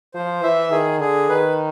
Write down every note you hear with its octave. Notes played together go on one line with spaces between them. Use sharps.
F3 C5
E3 E5
D#3 G#4
D3 G#4
D#3 B4